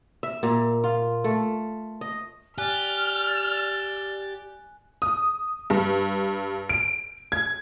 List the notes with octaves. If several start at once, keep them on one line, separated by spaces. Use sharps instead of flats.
E5
A#2
F4
A3
D#5
G4 D5 G#5 F6 F#6
D#6
G2
D7
G#6